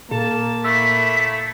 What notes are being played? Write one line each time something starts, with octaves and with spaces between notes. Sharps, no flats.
A#2 A#3 A5
A3 E4 E6 B6